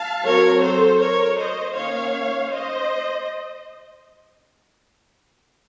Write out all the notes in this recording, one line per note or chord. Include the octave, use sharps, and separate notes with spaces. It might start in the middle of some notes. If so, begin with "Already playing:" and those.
Already playing: F5 A5
F#3 C4 A#4 C#5
A4 C5
A#4 C#5
C5 D#5
D#3 A#3 C#4 C#5 F5
C5 D#5